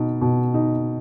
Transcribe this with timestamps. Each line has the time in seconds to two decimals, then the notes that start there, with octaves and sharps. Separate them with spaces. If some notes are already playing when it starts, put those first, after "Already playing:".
Already playing: B2 D#4
0.21 B2
0.54 D#4